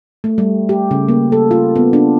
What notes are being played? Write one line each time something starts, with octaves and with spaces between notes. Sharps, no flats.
A3
G3
G4
C#3
A#3
A4
F4
B3
D4